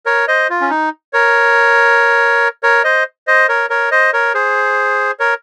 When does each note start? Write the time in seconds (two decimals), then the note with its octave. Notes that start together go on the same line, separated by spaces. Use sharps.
0.06 A#4 C#5
0.28 C5 D#5
0.50 F4
0.61 C#4
0.70 D#4
1.13 A#4 C#5
2.63 A#4 C#5
2.84 C5 D#5
3.27 C5 D#5
3.49 A#4 C#5
3.70 A#4 C#5
3.91 C5 D#5
4.13 A#4 C#5
4.34 G#4 C5
5.19 A#4 C#5